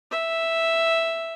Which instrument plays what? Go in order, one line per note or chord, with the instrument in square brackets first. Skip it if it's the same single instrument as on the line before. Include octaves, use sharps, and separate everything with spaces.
[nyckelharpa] E5